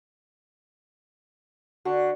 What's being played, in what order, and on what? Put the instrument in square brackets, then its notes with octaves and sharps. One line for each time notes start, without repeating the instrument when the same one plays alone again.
[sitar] D3 [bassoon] F#4